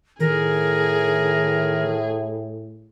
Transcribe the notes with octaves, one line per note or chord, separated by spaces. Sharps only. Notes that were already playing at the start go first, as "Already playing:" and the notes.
A2 D#3 G#4 A#4